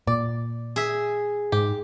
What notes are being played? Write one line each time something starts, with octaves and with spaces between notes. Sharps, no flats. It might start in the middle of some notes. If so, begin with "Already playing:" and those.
A#2 D5
G#4 E5
G#2 G4